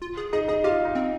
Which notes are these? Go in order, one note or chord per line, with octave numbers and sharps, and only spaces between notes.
F4
G#4
D#4 G#4
D#4 G#4
F4 G4
D#4
C4